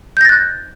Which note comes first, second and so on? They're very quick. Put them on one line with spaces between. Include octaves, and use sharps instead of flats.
G6 A#6 A6 F#6